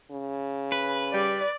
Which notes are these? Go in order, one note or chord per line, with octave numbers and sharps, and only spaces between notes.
C#3
B4
G3 D5